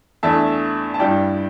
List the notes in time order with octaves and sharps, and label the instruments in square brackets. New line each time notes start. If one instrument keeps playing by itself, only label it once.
[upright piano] E2 E3 A3 D4 E5 A5
A5
G2 G3 E4 D5 G5